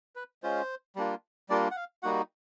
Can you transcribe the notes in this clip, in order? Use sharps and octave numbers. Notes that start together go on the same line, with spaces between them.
B4
G#3 C#4 F4 C5
G3 A#3 D4 F4
G3 A#3 D4 F4 D5
F#5
F5
G3 A#3 D#4 F#4 F#5